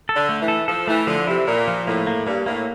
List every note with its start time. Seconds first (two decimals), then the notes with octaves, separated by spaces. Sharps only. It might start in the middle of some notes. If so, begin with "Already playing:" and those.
0.09 A4
0.15 D3
0.29 A3
0.41 E3
0.48 A4
0.68 F3 A4
0.87 E3 A3
1.07 D3 F3
1.27 C3 E4
1.47 A#2 A#4
1.68 F3
1.87 A2 A#3
2.07 A#3
2.27 G2 A#3
2.46 A2 A#3